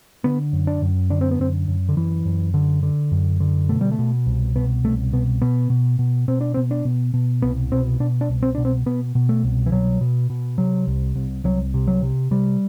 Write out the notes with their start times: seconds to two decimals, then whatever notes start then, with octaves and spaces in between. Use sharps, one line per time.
0.24 D3 B3
0.53 F#2
0.67 D4
0.82 F#2
1.10 D3 D4
1.21 C4
1.31 B3
1.40 F#2 C4
1.68 F#2
1.89 D3
1.96 F#2 E3
2.25 F#2
2.54 D3
2.83 D3
3.12 F#2
3.40 D3
3.69 B2 A3
3.81 G3
3.92 A3
3.99 B2
4.26 C2
4.56 B2 B3
4.84 C2 A3
5.13 B2 B3
5.42 B2 B3
5.70 B2
5.99 B2
6.28 B2 C4
6.41 D4
6.54 C4
6.57 B2
6.71 D4
6.85 B2
7.14 B2
7.42 C2 B3
7.72 B2 C4
8.00 B2 D4
8.21 D4
8.29 C2
8.43 C4
8.55 B2 D4
8.65 C4
8.86 B2 B3
9.15 B2
9.29 A3
9.44 C2
9.66 E3
9.72 B2 F#3
10.01 B2
10.30 B2
10.58 C3 F#3
10.87 C2
11.15 C2
11.44 C2 F#3
11.74 C3
11.87 F#3
12.02 C3
12.31 C3 G3